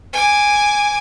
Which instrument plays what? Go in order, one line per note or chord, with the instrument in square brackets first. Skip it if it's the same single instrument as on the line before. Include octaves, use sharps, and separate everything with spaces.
[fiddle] G#5 D6